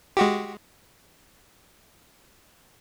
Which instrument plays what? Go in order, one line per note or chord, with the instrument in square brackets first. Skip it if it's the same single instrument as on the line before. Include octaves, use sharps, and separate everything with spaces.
[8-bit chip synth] G#3 F#4 G4